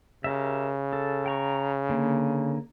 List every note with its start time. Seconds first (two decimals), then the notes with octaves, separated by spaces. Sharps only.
0.24 C#3 G4 A#4 E5
0.93 A4
1.26 G5 A#5 C#6
1.89 D3 A#3